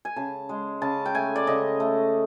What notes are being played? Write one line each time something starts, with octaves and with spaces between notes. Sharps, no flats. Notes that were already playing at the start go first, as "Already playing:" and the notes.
G#5
C#3 A5
G#3
C#3 A5
G5
A3 G#5
D5
C#3 D#5
A3